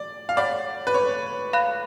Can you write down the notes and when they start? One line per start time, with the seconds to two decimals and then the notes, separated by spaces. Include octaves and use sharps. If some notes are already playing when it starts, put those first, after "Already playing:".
Already playing: D5
0.29 F5
0.37 C#5 D5 F#5 B5
0.87 B4
0.94 C#5
1.53 F5 B5 F#6